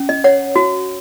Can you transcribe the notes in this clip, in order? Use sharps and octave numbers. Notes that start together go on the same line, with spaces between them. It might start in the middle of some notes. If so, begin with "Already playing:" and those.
Already playing: C#4
D#5
C#5 F#5
F#4